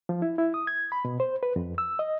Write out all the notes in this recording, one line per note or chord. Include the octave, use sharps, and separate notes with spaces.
F3
E4
E4
D#6
G#6
B5
B2
C5
B4
F2
E6
D#5